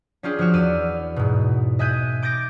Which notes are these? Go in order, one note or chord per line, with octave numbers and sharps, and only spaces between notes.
C#4 D4 F4 G4 G#4
F3 C#4 F#4 F6
E2 D5 E6 D#7
G#2 B2
D#5 E5 G#5 F#6 G6 D#7
D6 G6 A6 A#6 D7